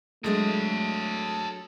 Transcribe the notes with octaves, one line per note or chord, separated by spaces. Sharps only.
F#3 G#3 A3 D4 A4 D#5